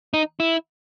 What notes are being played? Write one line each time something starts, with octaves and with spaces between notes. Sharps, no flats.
D#4
E4